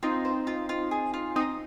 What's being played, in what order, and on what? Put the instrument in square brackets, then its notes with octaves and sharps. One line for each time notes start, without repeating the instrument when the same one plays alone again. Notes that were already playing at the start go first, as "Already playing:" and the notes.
[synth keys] C4 D#4 [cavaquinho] F4
[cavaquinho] C5
F4
F4
G#4
F4
[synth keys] C4 D#4 [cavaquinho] D#6